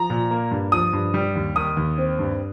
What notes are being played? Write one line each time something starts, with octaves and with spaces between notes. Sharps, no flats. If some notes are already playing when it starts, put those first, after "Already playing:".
Already playing: F3 A#5
A#2
A#3
G2
F3 D#6
G2
G3
D#2
D#3 D#6
D#2
C4
G2